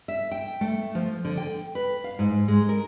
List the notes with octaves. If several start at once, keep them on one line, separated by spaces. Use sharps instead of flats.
E5
G5
A3
F3
D3
G5
B4
F5
G#2
G#3
A#4